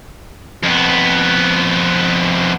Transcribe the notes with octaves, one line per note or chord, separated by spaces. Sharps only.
F2 B3